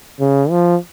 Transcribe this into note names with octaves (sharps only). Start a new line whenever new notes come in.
C#3
F3